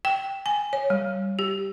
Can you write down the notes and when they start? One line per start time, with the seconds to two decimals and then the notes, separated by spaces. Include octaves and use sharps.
0.05 G5
0.46 G#5
0.73 C#5
0.90 G3
1.39 G4